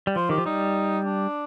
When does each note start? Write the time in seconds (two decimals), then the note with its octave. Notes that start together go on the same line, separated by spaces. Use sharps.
0.07 G3
0.16 F3 C5
0.29 D#3 G4
0.38 F3
0.46 G3 D#4
1.05 D4